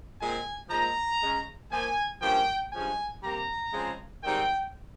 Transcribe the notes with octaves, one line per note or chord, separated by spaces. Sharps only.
A#2 G#3 C4 G#5
A#2 F3 G#3 D#4 A#5
C#3 G#3 C#4
A#2 F3 A#3 G#5
G2 F3 A#3 C#4 G5
G2 F3 G#3 C#4 G#5
C3 G3 A#3 A#5
C#3 F3 G#3 C4
G#2 D#3 G3 C4 D#4 G5